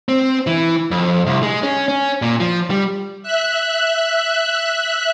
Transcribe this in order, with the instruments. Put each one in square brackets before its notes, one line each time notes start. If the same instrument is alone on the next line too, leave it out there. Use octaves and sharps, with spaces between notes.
[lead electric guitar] C4
E3
F2
C2
G#3
C#4
C#4
A#2
F3
G3
[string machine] E5 F#6